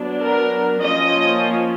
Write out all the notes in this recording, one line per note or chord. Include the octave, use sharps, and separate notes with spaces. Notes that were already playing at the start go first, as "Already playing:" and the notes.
Already playing: F#3 B3 D4
A#4
F3 A#3 C#4 D#5